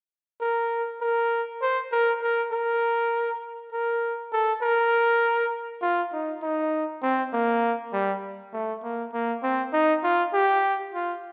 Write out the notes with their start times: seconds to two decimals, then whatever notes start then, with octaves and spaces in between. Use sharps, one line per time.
0.41 A#4
1.01 A#4
1.62 C5
1.92 A#4
2.22 A#4
2.52 A#4
3.73 A#4
4.33 A4
4.62 A#4
5.82 F4
6.13 D#4
6.43 D#4
7.03 C4
7.33 A#3
7.93 G3
8.53 A3
8.83 A#3
9.13 A#3
9.43 C4
9.73 D#4
10.04 F4
10.34 G4
10.94 F4